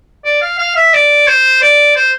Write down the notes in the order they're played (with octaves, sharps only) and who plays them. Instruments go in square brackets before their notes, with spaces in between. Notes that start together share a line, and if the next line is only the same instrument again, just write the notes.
[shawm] D5
F5
F5
E5
D5
C5
D5
C5